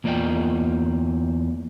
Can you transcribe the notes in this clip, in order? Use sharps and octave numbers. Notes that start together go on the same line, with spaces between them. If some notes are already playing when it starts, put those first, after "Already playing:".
E2 A#3 F4 D5 D#5 G5